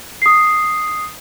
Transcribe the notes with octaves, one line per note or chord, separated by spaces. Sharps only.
D#6 C7